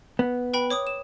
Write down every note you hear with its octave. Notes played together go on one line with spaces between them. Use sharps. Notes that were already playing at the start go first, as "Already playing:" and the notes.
B3
B4 G5 B5
C#5 D6 D#6
E7